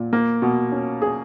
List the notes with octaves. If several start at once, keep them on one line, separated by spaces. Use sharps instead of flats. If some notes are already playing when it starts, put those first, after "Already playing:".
Already playing: A#2
A#3
B2
C#4
G#4